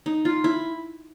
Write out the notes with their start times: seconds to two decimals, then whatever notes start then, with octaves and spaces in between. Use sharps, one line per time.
0.06 D#4
0.25 F4
0.44 E4